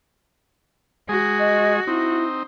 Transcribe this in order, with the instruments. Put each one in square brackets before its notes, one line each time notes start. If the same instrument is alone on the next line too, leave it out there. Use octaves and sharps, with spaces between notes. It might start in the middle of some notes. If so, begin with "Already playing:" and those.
[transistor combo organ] G#3 G#4 [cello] F#4
[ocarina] D#5
[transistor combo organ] C4 D#4 [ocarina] E4